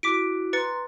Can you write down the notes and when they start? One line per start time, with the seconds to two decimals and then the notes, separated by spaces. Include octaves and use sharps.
0.03 E4 F#4 D6 B6 D7
0.53 B4 A#5 C6 A6 C#7